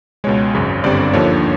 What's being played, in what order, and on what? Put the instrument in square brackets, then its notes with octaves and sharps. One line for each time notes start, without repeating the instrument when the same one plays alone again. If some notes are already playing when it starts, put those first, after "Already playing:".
[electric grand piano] C#2 B2 G#3 C#5
G#1 F#2 C#3
G1 G2 D3 G3 C4 D5
D#2 D3 F3 A#3 D#4 C#5